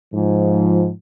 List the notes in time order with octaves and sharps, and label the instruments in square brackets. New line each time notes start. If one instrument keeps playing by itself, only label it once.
[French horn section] G#2 F3